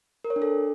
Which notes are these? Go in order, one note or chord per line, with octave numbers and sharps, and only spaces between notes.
A#4
C#5
D4
A4